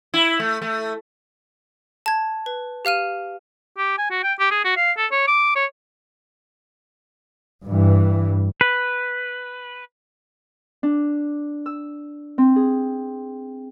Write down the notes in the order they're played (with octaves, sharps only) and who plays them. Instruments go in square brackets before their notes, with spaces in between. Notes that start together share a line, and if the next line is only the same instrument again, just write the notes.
[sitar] E4
A3
A3
[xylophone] A5 G#6
B4
G4 F5 F6 D#7
[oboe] G4
G#5
F#4
G5
G4
G#4
F#4
F5
A4
C#5
D6
C#5
[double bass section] G2 E3
[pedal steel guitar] B4
[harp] D4
E6
C4
G#4